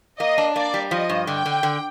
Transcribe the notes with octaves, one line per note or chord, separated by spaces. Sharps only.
A#3 D#5
D4
A#3 D5
G3
F3 D#5
G2
D3 G5
D3
D3